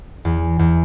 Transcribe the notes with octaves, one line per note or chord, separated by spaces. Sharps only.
E2
E2